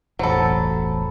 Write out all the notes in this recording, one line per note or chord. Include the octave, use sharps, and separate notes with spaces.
E1 A1 F#3 A4 C5 A5 B5